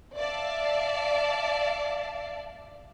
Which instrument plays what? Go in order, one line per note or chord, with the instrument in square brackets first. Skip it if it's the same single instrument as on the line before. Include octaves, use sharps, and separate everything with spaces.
[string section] D5 E5 F5 A5